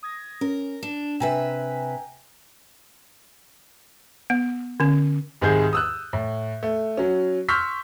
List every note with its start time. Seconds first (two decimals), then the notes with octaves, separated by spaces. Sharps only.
0.03 D#6 G#6 A#6
0.41 C#4 A#4
0.83 D4 E7
1.20 C3 B4 E5 G5 G#5 A#5
4.30 B3
4.80 D3 C#4
5.41 C2 G#2 D#3 G#3 G#4 G6
5.73 D#6 E6 F#6
6.13 A2
6.63 A3
6.97 F#3 C#4
7.49 C6 C#6 E6 F6 G6 B6